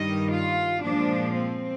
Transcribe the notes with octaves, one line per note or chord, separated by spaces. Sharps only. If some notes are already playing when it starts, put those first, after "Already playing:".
Already playing: G2 D#3 G3 D#5
F4
A#2 F3 G#3 D4
C4